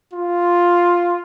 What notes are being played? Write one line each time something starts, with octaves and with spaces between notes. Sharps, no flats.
F4